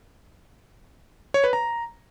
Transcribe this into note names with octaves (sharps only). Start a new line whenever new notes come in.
C#5
B4
A#5